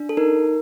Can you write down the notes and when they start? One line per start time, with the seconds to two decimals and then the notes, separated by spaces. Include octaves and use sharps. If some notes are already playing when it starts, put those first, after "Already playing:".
Already playing: D4
0.09 A4
0.17 D#4 A#4